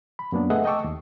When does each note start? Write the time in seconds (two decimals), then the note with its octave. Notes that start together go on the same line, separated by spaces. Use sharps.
0.19 B5
0.32 F#2 F#3 A#3 B3 D4
0.50 A3 G#4 B4 D#5 E5 F#5
0.65 D#5 G5 A5 C#6 D6 E6
0.84 D#2